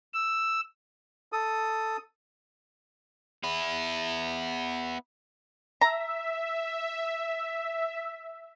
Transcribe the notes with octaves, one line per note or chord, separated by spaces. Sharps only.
E6
A4 D#6
B3 E4
E5 A#5